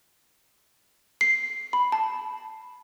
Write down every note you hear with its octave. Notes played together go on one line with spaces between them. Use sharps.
C7
B5
A5